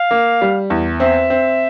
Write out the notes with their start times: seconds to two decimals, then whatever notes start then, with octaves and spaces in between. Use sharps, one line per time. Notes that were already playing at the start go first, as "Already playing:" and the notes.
Already playing: F5
0.11 A#3
0.41 G3
0.70 E2
1.00 C4 E5
1.30 C4